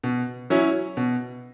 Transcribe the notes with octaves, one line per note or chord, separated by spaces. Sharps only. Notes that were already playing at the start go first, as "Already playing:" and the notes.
B2
F#3 C#4 E4
B2